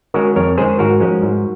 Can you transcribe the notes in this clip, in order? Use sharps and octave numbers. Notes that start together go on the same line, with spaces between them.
D#3 G#3 C#4 F#4 A#4
F2 A#4 C#5
D#3 G#3 C#4 G#4 C5
G#2 F#4 A#4
F3 G#3 C#4
G#2